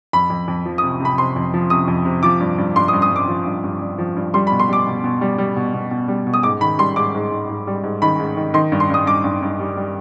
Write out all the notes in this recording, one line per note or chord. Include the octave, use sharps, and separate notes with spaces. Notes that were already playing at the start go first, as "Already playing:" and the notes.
F2 B5
F2
F2
F3
D#6
C3
C3 B5
C3 C6
F2
F3
C3 D#6
F2
C3
F3 D6
G2
G2
G2 C6
D#6
G2
D#6
G2
D6
F3
G2
G2
G2
F3
G2
G3 C6
B5
B2
C6
G3 D6
B2
B2
G3
G3
B2
B2
B2
G3
B2
D#6
G#2 D6
D#3 B5
G3 C6
G#2 D6
G#2
G#2
G#2
G3
G#2
D#3 B5
G#2
D#3
D#3 C6
G2
C6
G2 D#6
G2 D6
G2
G2
G3
G3